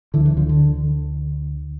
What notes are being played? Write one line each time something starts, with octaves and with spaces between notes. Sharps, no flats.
D2 D3 E3
E3
D3 F3
D3